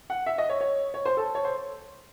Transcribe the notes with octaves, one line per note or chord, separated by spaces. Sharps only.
F#5
E5
D#5
C#5
C#5
C#5
C5
A4
C#5
C5